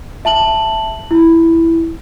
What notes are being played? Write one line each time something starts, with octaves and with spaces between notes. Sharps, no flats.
E5 A5 F#7
E4